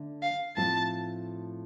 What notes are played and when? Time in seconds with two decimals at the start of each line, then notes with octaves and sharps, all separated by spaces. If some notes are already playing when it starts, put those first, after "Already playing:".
Already playing: D3 A3 D4
0.22 F5
0.57 A2 F3 A3 C4 F4 A5